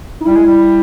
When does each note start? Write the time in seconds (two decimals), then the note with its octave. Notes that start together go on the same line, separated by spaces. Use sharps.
0.21 D#4
0.25 G3 E4
0.36 G#3
0.46 G3